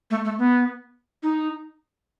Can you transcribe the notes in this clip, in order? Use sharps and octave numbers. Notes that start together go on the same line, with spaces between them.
A3
A3
B3
D#4